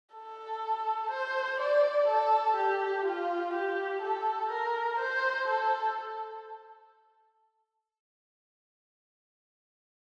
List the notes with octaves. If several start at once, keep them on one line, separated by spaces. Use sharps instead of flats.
A4
C5
D5
A4
G4
F4
G4
A4
A#4
C5
A4